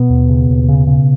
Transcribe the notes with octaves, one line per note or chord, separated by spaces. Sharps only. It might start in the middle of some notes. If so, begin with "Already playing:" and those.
Already playing: B2 B3
D#2
C#3
D#2
C#3
C#3